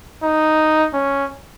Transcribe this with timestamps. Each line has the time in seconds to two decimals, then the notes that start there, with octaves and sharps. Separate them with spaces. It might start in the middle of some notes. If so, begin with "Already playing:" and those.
0.23 D#4
0.94 C#4